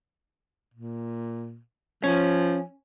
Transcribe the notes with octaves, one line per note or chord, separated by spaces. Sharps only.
A#2
F3 C#4